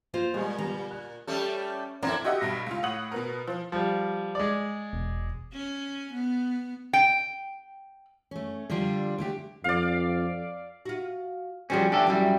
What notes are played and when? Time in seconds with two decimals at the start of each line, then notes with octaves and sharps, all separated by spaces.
0.14 A#3 F4 C5
0.34 A#2 G3 G#3
0.58 D3 G3 B3 A#5
0.91 F#6
1.27 G3 A3 C#4 A4
2.03 A#3 C4 D4 E4 A4 A#5
2.24 F#4 G4 D#5 E5 F#5
2.41 B1 G2 A#6
2.67 C#2 F4
2.83 A2 C#5 F#5 D#6 F#7
3.12 B2 B3 A#4
3.47 F3
3.72 F3 G3
4.35 G#3 D5
4.93 E1
5.53 C#4
6.14 B3
6.93 G5
8.31 A3 C#4
8.70 D3 F3 G3 D4 F4
9.18 D3 A3 G4
9.64 F2 D5 F5
10.85 F4 F#4
11.70 F3 G3 C4 C#4 F#4 G#4
11.92 A3 D4 G4 A4
12.07 F#2 G3 D4 E4 F#4